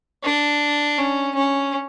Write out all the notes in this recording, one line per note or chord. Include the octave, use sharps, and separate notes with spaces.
D4
C#4
C#4